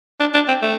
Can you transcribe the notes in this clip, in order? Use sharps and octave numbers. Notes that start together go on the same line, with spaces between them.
D4
D4
C4
A3